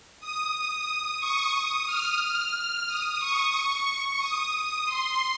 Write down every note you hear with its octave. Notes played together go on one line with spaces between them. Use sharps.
D#6
C#6
D#6
F6
D#6
C#6
D#6
C6